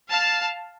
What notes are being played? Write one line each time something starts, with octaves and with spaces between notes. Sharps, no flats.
F5 A5